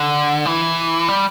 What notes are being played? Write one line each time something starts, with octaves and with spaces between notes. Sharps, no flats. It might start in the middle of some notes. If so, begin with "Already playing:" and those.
Already playing: D3
E3
G3